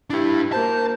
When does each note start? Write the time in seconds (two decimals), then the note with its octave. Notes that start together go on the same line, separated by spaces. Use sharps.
0.10 D4 E4 G4
0.52 A#3 F#4 C5 A5